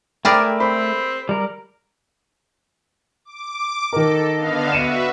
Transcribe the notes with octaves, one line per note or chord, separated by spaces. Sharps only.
A3 G#4 A#4 D5 G5 B5 D6
C4 B5
G3 A#4
D6
D#3 A4 A#4 D#5
D3 B3 F5
F#4 B4 E5 C#7 D#7 E7